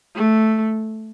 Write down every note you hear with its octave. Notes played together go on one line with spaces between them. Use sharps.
A3